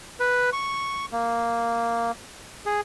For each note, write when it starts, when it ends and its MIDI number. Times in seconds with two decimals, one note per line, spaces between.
0.20 0.50 71
0.53 1.06 85
1.12 2.11 58
2.66 2.81 68